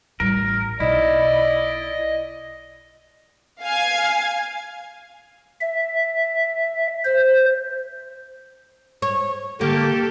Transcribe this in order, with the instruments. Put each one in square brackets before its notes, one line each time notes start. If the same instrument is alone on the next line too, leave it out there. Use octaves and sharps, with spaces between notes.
[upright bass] A1 G3 [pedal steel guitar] A#4
[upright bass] B1 [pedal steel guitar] E4 [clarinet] D5 [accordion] D#5
[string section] F5 G#5 G#6
[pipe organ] E5
C5
[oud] C#5
[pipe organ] D3 [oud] A#3 [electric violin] G4 A4